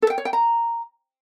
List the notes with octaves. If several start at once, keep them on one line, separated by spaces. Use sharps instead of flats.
A4
G5
C#5
G5
A#5